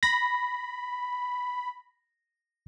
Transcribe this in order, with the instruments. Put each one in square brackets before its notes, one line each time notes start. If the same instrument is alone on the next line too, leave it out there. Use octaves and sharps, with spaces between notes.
[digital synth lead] B5 [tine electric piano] A#6